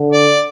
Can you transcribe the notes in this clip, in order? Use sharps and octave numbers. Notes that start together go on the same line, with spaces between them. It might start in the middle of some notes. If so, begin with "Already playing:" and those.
Already playing: D3
D5